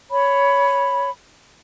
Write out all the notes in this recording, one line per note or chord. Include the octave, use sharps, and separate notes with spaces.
C#5 B5